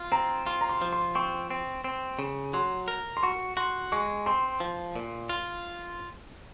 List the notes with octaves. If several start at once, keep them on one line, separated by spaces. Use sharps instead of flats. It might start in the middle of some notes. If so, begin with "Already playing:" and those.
Already playing: F4
C4 A#5
F4 C6
A#5
C6
F3
C6
C4 C#6
C4
C4
C#3
F#3 C6
A#4
C6
F#4 C#6
F#4 C6
G#3 C#6
C4 C6
F3
A#2
F4